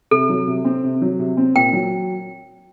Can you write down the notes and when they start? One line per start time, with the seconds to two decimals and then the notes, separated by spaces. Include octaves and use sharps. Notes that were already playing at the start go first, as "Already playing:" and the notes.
0.11 C3 A4
0.29 F#3
0.48 C3
0.65 C4
0.84 C3
1.02 F#3
1.19 C3
1.37 C4
1.55 A#2 G5
1.73 F#3